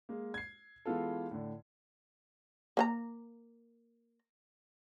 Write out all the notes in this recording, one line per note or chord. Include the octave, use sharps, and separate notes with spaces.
G#3 A#3
G#6 C7
E3 G#3 B3 F4 A4
A2 D3
A#3 C5 A#5